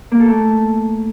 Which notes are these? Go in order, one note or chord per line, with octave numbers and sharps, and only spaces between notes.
A#3
A4
A3